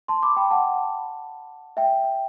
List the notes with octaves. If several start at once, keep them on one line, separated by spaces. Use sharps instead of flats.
A5 C6
B5 D6
G5 B5
F#5 A5
E5 G5